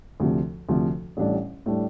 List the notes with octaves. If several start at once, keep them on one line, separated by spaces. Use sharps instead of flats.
D2 C3 F3
D2 C3 F3
A1 A2 G3 D4
A2 G3 D4